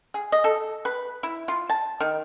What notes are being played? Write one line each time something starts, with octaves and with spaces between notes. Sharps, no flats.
G#4
D#5
A4
B4
E4
F4
A5
D#3